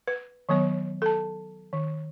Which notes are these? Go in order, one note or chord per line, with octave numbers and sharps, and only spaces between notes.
B4
D#3 F#3 B3 C#5
A4 A5
D#3